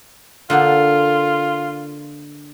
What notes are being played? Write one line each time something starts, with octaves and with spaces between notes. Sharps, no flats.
D3 A#3 D4 F4